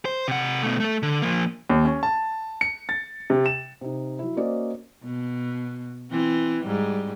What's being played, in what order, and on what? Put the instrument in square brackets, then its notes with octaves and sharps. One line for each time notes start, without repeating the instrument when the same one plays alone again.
[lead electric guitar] C5
C3 F#5
B2 A3
A3 A4
D3
F3 A#3
[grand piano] D#2
C#4
A5
C#7
A6
C3
E7
[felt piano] C3 D#4
F#3 E4
A#3 C#4 F#4 C5 D5 D#5
[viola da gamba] B2
E3 C4
G#2 G3